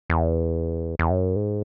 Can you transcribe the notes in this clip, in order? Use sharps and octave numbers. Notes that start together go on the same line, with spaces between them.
E2
E2
F#2
G#2